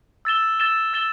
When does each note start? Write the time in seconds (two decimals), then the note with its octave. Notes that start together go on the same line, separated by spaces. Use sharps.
0.25 E6 A6 E7 G7
0.60 E6 A6 E7 G7
0.93 E6 A6 E7 G7